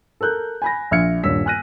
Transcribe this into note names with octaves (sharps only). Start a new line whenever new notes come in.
A4 A#4 F#6 G6
G#5 B5 A#6
A#1 E5 F6 G#6 C#7
D#1 G2 C#5 E6 B6
G#5 F6 F#6 A#6 D#7